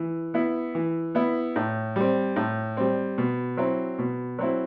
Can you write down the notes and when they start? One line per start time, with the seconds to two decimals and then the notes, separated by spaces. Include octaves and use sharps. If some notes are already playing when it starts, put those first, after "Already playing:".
Already playing: E3
0.34 B3 E4
0.75 E3
1.15 B3 E4
1.56 A2
1.96 G3 C4
2.36 A2
2.77 G3 C4
3.18 B2
3.57 F#3 C4 E4
3.98 B2
4.39 F#3 C4 E4